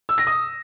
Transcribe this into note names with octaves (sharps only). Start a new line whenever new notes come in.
E6
A#6
D#6